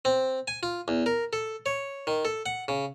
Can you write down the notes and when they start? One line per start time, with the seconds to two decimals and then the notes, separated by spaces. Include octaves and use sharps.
0.05 C4
0.48 G#5
0.63 F4
0.88 E2
1.06 A#4
1.33 A4
1.66 C#5
2.07 D#3
2.25 A4
2.46 F#5
2.68 C#3